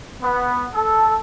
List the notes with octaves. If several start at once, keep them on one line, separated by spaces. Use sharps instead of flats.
B3
A4